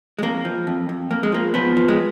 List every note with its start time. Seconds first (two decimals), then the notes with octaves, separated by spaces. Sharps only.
0.19 G#3
0.22 F2 A#3
0.45 F3
0.67 F2
0.89 F2
1.10 F2 A#3
1.23 G#3
1.32 F3 A#3
1.54 F3 B3
1.77 F3
1.88 G#3